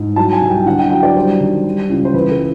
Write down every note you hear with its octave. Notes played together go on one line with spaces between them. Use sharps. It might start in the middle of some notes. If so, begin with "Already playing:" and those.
Already playing: G#2
F#3 A5
G#5
C2
G5
D3 F#5
G5
F#3 G5
D5
G3 C5
D#3
G3
C#2
C5
E3 B4
A4